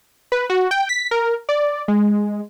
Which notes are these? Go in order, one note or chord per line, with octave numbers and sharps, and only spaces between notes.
B4
F#4
G5
B6
A#4
D5
G#3